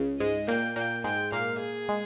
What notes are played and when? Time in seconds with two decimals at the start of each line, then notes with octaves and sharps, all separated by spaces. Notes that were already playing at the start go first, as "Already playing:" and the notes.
Already playing: C#2 C#3
0.20 G#2 G#3 D#5
0.48 A#2 A#3 G5
0.76 A#2 A#3 G5
1.04 G#2 G#3 G5
1.32 A#2 A#3 F5
1.60 G#4
1.89 G#3